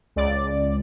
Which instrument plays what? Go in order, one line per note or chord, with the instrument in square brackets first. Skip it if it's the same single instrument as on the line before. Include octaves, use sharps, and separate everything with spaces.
[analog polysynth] C#2 D5